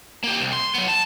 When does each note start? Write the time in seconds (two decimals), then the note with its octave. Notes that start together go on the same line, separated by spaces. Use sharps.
0.24 A#3 G4
0.40 C2
0.53 C6
0.74 F#3 B3
0.88 A5